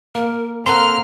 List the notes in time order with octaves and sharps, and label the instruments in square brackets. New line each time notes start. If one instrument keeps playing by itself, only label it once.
[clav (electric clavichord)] A#3 [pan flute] A#4
[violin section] A#3 F6 [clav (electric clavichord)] C4 A4 F#5 [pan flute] A#5 [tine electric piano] C6